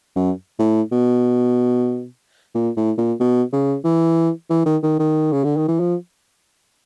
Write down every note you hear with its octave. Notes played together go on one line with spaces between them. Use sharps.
F#2
A2
B2
A#2
A2
A#2
B2
C#3
E3
E3
D#3
D#3
D#3
C#3
D3
D#3
E3
F3